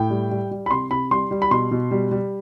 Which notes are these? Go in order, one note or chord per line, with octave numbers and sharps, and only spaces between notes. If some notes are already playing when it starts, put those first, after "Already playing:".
Already playing: A2 G5
G3
G3
G3
B5
C3 C6
C3 B5
G3 C6
G3
B5
B2 C6
B2
G3
G3